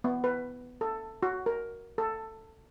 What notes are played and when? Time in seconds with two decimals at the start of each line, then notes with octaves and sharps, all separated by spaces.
0.04 B3
0.24 B4
0.81 A4
1.23 F#4
1.46 A#4
1.98 A4